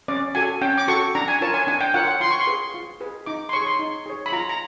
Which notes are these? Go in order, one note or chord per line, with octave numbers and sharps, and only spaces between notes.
C#4 D5
F#4 A4 G#5
C#4 G5
D6
F#4 A4 C#6
D4 A#5
G#5
F4 A#4 C#5 A5
G#5
D4 G#5
G5
F4 A#4 C#5 F#5
F#5
F4 C6
C#6
C6
G#4 B4
F4
G#4 B4
D#4 D6
C6
G#4 C#5 C#6
C6
D#4
G#4 C#5
B5
F4 A#5
A#5